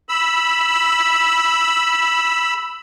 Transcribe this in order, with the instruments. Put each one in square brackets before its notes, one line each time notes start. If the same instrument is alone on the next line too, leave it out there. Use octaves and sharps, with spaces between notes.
[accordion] B5 E6